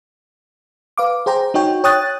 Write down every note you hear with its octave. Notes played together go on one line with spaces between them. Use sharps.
B4 F5 D6
G#4 C5 G5 A#5
D#4 F#4 C#5 G5
C#5 G5 D#6 F#6 A6